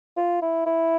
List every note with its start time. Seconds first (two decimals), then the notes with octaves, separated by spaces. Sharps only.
0.17 F4
0.42 E4
0.66 E4